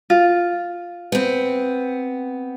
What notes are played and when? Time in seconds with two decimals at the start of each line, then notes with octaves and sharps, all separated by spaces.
0.10 F4
1.12 B3 C4